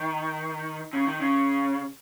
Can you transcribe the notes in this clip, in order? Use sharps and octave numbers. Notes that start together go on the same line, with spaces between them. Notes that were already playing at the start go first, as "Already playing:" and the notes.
Already playing: D#3
C#3
D#3
C#3